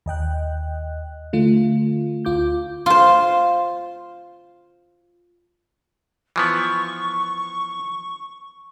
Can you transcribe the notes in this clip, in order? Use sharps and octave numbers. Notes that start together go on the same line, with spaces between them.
D#2 D#5 G5 F#6
D3 A3 F4
D2 F4 D6 G6
F4 C5
E3 F3 B3 C#6